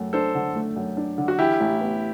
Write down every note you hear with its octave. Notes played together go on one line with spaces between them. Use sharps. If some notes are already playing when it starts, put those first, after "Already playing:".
Already playing: F#2 A3
D4 A4 C5
D3
A3
F#2
D4
D3
F#4
E3 E4 G4
A1
B3